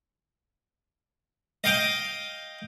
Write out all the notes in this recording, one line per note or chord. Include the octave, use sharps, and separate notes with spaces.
D#5 F5 G5